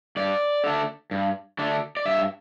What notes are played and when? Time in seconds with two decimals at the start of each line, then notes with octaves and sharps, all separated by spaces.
0.16 G2 D5
0.64 D3 A3 D4
1.11 G2
1.59 D3 A3 D4
1.97 D5
2.06 G2 E5